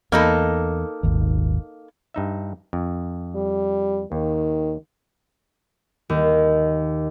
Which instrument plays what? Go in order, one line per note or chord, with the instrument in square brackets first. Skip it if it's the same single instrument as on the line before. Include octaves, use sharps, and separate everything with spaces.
[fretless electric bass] E2 [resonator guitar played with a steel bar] A#3 D#4 A4
[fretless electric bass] D#1 G#1 D#2
[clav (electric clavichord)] G2 D#4 E5
F2
[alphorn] G3
[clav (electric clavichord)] D#2 [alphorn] D#3
[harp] D#2